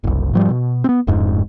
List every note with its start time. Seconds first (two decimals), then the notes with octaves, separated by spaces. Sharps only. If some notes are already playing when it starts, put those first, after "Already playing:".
0.04 F#1 C2
0.33 G#2 F3 G3
0.50 B2
0.84 B3 C4
1.07 D1 F2 G#2